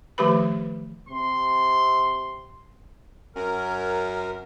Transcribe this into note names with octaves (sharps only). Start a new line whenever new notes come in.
D#3 F3 A3 G4 B4 B5
C3 C6
F#2 A#4